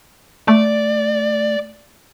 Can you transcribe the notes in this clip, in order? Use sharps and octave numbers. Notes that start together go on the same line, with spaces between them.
A3 D5